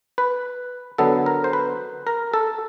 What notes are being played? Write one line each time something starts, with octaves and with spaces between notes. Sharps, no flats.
B4
D3 F#3 B3 A4
A#4
C5
B4
A#4
A4